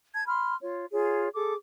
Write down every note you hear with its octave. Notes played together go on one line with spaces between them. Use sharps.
A5 G#6
B5 C6 F6
F4 C#5
F4 G#4 C#5
G#4 A4 D6